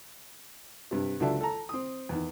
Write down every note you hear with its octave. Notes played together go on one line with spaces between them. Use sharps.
G2 C3
C#2 D3 F#3 A4 D5 E5
A4 A#5
C4 D#6
E2 D#3